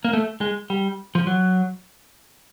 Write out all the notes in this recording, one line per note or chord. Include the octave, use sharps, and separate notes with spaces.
A#3
A3
G#3
G3
F3
F#3